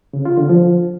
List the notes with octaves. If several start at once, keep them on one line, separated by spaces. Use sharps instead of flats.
C#3
F4
D3
F3